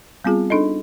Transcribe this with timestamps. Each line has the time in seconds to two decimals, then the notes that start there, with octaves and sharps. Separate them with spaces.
0.24 G3 B3 C4 F4 G#4
0.50 D4 D#4 A4 D#5